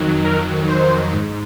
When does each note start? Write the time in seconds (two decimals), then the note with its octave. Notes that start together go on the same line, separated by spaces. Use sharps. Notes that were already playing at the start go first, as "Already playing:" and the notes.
Already playing: F2 D#3 F#3
0.25 A#4
0.69 C5
1.13 G#2